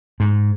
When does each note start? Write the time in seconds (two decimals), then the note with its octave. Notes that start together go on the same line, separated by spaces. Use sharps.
0.20 G#2